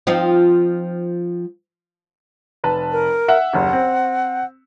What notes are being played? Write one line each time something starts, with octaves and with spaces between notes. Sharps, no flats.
F3 C4 D#4
F1 B4 A5
A#4
E5 F#5
F#1 D#2 F#5
C4